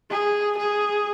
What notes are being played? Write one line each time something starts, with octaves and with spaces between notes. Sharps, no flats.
G#4
G#4